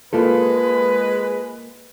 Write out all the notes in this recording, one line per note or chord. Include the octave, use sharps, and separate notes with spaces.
G#3 A#3 F4 A4 B4